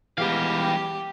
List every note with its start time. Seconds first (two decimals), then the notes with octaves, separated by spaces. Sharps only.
0.18 E3 G3 G#3 B3 G4 F5